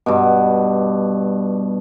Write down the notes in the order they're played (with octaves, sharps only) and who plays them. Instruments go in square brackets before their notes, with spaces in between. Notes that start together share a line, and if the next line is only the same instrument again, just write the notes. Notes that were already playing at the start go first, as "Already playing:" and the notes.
[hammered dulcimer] G2 B2